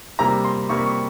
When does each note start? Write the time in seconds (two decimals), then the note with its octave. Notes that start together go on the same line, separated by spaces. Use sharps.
0.19 C3 G3 A#3 A#5
0.44 C6
0.69 C3 G3 A#3 C#6
0.86 C#6